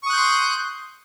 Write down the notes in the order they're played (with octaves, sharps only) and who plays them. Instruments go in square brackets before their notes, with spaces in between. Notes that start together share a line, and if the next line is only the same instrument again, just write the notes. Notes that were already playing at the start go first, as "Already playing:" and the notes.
[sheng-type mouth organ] C#6
D#6
F#6
G6
C6